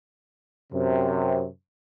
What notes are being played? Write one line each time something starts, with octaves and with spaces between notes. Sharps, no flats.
F#2 C3